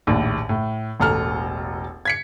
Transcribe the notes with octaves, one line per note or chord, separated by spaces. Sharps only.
A#1 D#2 A2
A2
E1 A1 A4 A#5 F6
G#6 B6 C#7